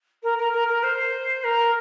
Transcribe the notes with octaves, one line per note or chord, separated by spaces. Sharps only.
A#4
A#4
A#4
A#4
C5
A#4